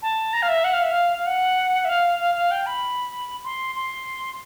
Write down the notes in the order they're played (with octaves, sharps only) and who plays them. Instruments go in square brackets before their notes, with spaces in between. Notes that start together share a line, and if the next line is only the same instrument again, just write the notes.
[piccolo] A5
A#5
F5
E5
F#5
F5
E5
F5
F5
F#5
E5
F5
F5
F5
G5
B5
C6
C6